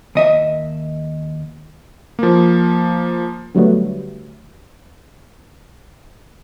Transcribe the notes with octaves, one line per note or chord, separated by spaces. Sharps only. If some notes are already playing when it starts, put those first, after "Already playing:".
D#2 D#5 E5
F3 A#3
D3 F#3 G3 A3 B3